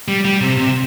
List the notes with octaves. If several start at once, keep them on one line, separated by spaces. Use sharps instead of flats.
G3
G3
C3
C3